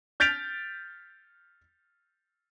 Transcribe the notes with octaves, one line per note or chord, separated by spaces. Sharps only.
F6 G6 A6 B6 D7 F7